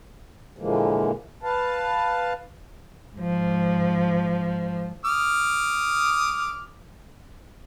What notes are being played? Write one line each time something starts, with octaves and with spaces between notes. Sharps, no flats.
A#2 D3 E3 F3 G#3 A#3
B4 F5 A5
G#2 F3
D6 D#6 F6